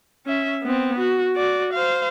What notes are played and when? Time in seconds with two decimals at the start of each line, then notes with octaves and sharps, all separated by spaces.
0.26 C#4 E5
0.63 B3 C4
0.98 F#4
1.36 F#4 D5
1.73 C5 F5